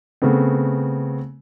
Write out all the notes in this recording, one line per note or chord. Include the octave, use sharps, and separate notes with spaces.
C#3 A3 B3 C4